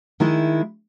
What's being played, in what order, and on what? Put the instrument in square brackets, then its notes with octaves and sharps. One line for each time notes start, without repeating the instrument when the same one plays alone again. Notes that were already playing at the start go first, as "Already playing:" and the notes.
[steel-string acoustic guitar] D#3 G#3 E4